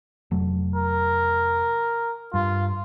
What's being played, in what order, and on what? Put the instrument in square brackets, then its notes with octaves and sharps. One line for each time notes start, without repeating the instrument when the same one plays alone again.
[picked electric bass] F1 F#3 A3
[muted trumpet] A#4
[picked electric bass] G2 [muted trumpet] F4